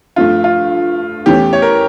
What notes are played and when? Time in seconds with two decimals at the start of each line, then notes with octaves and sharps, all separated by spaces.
0.16 G2 F3 A3 F4
0.44 F4
1.26 E2 E3 A3 C#4 G4
1.53 C#5
1.62 A#4